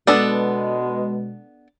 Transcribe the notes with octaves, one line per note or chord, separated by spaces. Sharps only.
B2 G#3 B3 D4 A4